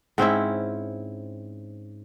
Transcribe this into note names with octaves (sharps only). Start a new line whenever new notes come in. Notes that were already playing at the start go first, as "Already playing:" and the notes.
G#2 C4 C#4 E4